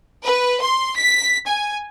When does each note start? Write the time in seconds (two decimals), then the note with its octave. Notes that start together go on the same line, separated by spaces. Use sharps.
0.23 B4
0.61 C6
0.97 B6
1.46 G#5